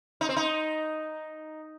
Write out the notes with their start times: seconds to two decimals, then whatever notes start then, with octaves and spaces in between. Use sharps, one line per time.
0.21 D#4
0.29 C4
0.36 D#4